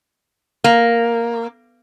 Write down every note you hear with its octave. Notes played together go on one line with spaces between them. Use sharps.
A#3